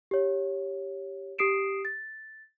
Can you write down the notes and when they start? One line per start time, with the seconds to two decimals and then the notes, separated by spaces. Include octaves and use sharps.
0.11 G4 C#5
1.38 G4 D#6 C7 D7 E7
1.85 A6